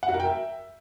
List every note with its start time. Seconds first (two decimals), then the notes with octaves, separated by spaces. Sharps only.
0.03 F#5
0.08 F#4
0.14 A#4
0.20 G5
0.25 E5